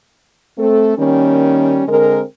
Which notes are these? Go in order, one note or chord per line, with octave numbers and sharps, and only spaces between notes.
A3 C4 A4
D#3 G3 A#3 C#4
D3 G#3 C4 A#4